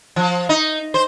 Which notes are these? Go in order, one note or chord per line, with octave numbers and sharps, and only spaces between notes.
F3
D#4
C5